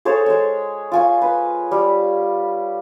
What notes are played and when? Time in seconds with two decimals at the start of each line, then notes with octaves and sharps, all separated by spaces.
0.05 G#4 A4 C5 C#5
0.26 G#3 C#5
0.92 F4 G#5 C#6
1.22 B4
1.71 G3